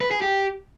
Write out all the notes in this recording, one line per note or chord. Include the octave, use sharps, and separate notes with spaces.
B4
G#4
G4